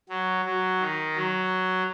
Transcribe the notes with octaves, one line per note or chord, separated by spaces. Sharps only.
F#3
F#3
D#3
F#3